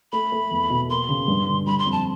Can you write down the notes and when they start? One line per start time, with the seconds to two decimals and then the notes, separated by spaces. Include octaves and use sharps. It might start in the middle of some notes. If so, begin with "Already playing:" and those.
0.12 A3 B5
0.32 A3
0.51 E2
0.70 B2
0.89 A#3 C6
1.09 C#3
1.28 G2
1.47 D3
1.66 G3 B5
1.79 C6
1.86 F2
1.92 A5